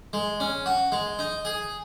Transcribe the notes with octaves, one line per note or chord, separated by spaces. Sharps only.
G#3
C#4
F#4
G#3
D#4
G#4